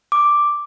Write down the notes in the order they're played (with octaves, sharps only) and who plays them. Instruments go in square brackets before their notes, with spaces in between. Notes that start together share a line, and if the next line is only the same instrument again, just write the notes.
[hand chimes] D6